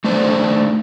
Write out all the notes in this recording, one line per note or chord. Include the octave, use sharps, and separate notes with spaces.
A3 D4 D#4 C5 D5